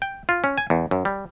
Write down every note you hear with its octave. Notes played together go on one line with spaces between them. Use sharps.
G5
F4
C#4
G#5
E2
F#2
G3